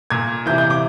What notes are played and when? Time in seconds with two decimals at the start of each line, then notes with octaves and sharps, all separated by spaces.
0.10 A#2 G#6
0.46 C3 E3 G6
0.58 G6
0.70 D6